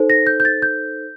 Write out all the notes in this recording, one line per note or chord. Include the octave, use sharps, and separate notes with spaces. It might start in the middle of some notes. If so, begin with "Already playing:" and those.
Already playing: D#4 A4 C5
A#6
G6
G6
A6
G6